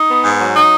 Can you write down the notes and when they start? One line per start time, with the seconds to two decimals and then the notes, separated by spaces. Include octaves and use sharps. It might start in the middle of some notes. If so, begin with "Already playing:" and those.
Already playing: D#4
0.08 B3
0.23 G#2
0.39 F#3
0.55 D#4